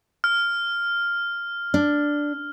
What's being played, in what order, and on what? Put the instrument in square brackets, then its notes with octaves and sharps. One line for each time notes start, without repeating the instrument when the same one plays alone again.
[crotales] F6
[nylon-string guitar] D4